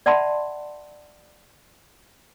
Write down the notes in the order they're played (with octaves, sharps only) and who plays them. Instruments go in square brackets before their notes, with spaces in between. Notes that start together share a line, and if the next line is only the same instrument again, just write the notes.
[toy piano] D5 E5 F#5 A5 B5 C6